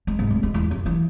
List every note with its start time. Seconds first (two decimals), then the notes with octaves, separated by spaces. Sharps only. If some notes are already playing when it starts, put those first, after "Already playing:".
0.07 G#3
0.19 G#2
0.30 D1
0.43 G#3
0.54 E2
0.71 F#2
0.86 E3